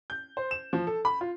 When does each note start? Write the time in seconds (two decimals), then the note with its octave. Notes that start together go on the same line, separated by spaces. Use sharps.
0.10 G6
0.37 C5
0.51 E7
0.73 F3
0.87 A4
1.05 B5
1.21 F4